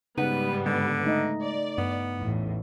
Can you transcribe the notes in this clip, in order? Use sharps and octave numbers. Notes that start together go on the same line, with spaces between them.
G#2 C#3 G3 B3 D#4 B4 F#5
D3 G#3
A3 D#4 D#5
D5
G2 B3
A1 E2 A2